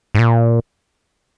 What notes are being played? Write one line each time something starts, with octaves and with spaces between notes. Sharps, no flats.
G#2
A#2